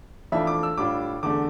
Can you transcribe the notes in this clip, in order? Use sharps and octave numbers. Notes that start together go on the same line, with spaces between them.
F2 E3 A3 D4 F4 E5
D6
E6
A2 G3 D4 F4 D6
E2 D3 A3 D4 D6